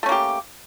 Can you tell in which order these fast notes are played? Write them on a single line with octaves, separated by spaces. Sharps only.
A3 C#4 A#3 G4